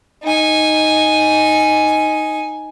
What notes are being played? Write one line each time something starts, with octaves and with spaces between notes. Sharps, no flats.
D#4 G#5